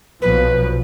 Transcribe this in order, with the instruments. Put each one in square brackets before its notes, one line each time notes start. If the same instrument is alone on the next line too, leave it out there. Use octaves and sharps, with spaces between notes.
[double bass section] B1 B2 F3 [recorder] B4